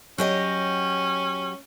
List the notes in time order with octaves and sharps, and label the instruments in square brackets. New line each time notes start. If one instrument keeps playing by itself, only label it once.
[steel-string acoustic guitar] F#3 G4 D#5 [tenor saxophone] C#4